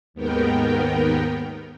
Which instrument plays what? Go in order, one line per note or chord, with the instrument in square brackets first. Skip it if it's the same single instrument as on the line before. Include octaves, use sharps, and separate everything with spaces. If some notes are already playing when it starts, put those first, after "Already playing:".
[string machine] D#2 G#2 B3 A#4 G5